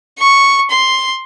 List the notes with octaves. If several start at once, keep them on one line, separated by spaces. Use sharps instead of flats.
C#6
C6